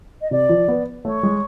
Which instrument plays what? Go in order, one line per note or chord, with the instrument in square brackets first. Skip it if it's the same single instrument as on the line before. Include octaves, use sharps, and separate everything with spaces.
[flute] D#5
[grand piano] C3 [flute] D5
[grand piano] F3
B3
[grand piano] A3 [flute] C#5
[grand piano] G#3